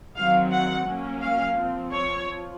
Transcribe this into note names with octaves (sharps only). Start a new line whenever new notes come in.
D#3 F#3 C4 F5
F#5
F#3 A#3 C#4
F5
F3 C4
C#5
F3